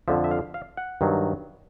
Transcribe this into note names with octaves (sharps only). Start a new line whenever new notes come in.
F2 D3 F3 E5
E5
F5
F5
F#5
G2 D#3 F#3